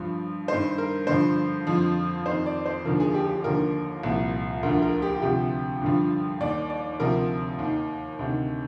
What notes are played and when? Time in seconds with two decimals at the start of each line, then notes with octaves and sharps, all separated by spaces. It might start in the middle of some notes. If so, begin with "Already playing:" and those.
Already playing: G2 F3
0.48 G2 D#3 C5
0.78 A#4
1.07 G2 D3 F3 C5
1.67 F2 D3 F3
2.26 F2 D#3 C5
2.46 D5
2.66 C5
2.85 D#2 D3 F3 A#4
3.00 G#4
3.14 G4
3.29 G4
3.44 D#2 D3 F3 A#4
4.03 C2 A#2 F3
4.63 D2 D3 F3 A#4
4.82 A#4
5.02 G4
5.22 D2 C3 F3 G4
5.81 G2 D3 F3
6.40 D#2 D#3 D5
6.70 D5
7.00 D2 C3 F3 A#4
7.59 D#2 D#3
8.19 D2 C3 D#3